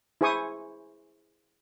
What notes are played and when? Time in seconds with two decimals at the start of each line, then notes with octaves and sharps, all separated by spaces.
0.21 E4 G#4 C5 G#5 C#6 D#6